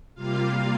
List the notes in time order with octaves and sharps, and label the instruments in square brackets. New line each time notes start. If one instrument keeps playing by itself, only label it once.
[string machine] C3 G3 A#3 F4 F5